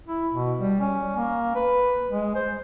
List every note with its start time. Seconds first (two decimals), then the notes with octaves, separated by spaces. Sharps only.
0.07 E4
0.33 B2
0.58 G3
0.81 C#4
1.17 A#3
1.55 B4
2.10 G#3
2.35 C5